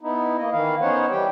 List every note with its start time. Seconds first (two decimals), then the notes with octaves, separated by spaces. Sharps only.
0.01 B3 D#4 E4
0.38 A#3 D#5
0.52 D#3 E3 E4 F5
0.81 B3 C#4 D#4 C5 C#5 F#5
1.10 E3 G3 G4 G5